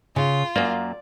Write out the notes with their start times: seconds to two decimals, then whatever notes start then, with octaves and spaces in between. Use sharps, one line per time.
0.16 C#3 F4
0.56 F#2 A#3 D5